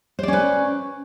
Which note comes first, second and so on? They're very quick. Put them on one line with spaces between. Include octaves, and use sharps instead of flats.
C5 D5 C#4 B4